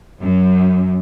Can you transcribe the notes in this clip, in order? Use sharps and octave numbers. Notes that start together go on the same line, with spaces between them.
F#2